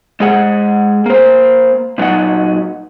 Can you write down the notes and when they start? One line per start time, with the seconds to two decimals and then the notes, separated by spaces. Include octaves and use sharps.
0.20 G#3 G#4 F#5
1.06 A#3 C5
1.98 A#2 F#3 D#4 F#5